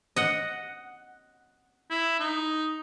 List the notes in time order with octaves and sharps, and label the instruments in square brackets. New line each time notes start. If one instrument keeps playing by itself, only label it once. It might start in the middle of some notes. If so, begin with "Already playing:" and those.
[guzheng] D#5 F#5
[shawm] E4
D#4